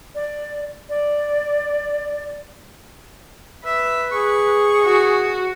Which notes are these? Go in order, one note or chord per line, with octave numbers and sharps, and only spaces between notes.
D5
D5
B4 E5
G#4 C#6
F#4